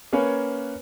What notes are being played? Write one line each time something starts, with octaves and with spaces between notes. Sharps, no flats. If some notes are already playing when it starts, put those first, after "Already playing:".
A#3 C#4 B4 C#5 G#5